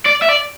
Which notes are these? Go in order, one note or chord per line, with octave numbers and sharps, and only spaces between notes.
D5
E5
D5